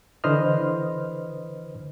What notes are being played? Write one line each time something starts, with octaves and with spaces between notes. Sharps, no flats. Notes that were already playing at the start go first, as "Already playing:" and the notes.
D3 E3 B4 C5 D#5 F6